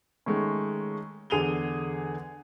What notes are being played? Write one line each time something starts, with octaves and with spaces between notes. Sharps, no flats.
D#3 G#3 A3 C#4
E2 D3 G#4 D#7 F7 G7